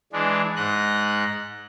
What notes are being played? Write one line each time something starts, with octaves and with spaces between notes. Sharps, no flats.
E3 G#3 D4
G#2 D#5 F#6